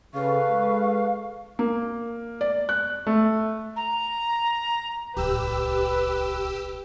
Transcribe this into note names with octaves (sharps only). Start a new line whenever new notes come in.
C#3 A4 B4 F5 C#6
G#3
A#3
D5
F#6
A3
A#5
D1 C2 G4 B4 E6